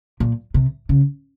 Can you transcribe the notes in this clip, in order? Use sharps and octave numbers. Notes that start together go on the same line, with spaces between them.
A#2
C3
C#3